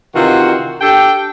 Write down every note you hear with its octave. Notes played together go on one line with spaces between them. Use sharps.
C3 D#3 E3 F4 F#4
D4 G4 A4 G5